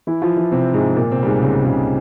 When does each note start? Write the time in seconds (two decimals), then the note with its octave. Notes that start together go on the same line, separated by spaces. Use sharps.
0.07 E3 E4
0.22 F3 F4
0.37 E3 E4
0.52 C3 C4
0.74 G#2 G#3
0.97 A#2 A#3
1.12 C3 C4
1.23 G3
1.26 G#2 G#3
1.42 C#2 C#3
1.64 C#2 C#3